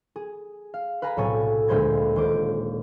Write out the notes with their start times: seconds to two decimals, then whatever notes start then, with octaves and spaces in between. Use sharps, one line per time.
0.16 G#4
0.74 F5
1.02 B4 F5 G#5 A#5 B5
1.17 B1 A2 C3 A4 C#5 G#5
1.68 D2 A#2 G#3 C5 B5 G#6
2.16 D#1 C5 D6